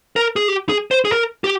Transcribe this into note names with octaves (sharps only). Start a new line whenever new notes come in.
A#4
G#4
G4
G#4
C5
G#4
A#4
G4